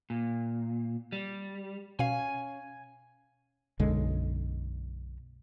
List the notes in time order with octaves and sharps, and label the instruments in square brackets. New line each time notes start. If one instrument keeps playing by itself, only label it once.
[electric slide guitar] A#2
G3
[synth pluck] B2 F5 [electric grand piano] C#4 [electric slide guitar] G#5
[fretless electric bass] B1 F#2 D3 G#3